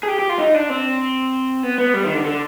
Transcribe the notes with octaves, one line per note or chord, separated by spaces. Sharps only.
G#4
G4
G4
F4
D#4
D4
C4
B3
B3
G3
D#3
D3
D3